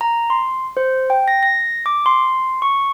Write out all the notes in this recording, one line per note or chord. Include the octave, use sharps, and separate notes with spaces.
A#5
C6
C5
G5
A#6
A#6
D6
C6
C#6